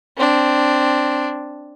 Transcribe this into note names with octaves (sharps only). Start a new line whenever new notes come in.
C4 D4